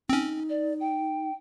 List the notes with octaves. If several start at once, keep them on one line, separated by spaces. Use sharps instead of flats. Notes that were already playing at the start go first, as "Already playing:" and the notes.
C4 C#4 D#4
D5
G5